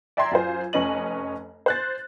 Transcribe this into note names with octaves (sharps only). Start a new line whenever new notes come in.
D5 E5 G5 A#5 C6 G#6
F#2 F4 C5
F1 C#4 B4 D#5 F#7
C5 F#6 A6